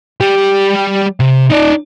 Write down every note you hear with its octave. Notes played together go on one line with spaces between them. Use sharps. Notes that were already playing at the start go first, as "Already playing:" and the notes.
G3 G4
C3
D#4 D5